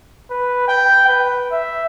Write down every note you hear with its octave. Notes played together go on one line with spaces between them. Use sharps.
B4
G5
B4
E5